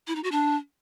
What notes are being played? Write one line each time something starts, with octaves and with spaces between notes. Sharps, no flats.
E4
D#4
F#4
D4